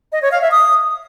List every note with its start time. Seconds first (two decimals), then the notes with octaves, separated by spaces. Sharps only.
0.12 D#5
0.22 C#5
0.32 F5
0.42 E5
0.51 D#6